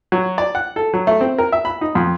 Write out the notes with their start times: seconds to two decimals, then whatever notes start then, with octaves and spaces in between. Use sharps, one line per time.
0.12 F#3
0.38 D5
0.55 F#5
0.76 A4
0.94 F#3
1.07 A3
1.21 C4
1.38 A#4
1.52 E5
1.65 B5
1.81 D#4
1.95 F2